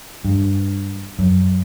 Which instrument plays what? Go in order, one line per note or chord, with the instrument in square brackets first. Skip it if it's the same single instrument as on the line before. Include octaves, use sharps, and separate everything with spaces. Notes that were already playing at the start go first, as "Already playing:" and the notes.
[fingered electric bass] G2
F#2